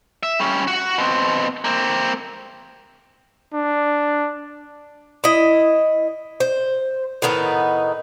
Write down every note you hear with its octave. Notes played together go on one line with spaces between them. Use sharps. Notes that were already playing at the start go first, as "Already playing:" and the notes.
E5
G3 C#4
F#4 F#5
B2 C4
A#3 C4
D4
E4 D#5
C5
A2 D#3 B3 D#4